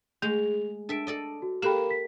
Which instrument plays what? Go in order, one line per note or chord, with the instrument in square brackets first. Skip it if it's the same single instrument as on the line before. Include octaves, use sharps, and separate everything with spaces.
[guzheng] G#3 [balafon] A3 [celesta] G#4 F7
[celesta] D4 D7 [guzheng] A4 E5
[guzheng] A4 D5 D#5
[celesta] F#4
[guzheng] A#3 [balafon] G4 A4 G5 [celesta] B5 E7
[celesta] B6